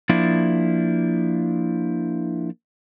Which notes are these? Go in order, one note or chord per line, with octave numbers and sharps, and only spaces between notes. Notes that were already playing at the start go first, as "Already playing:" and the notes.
F3 A#3 D4 E4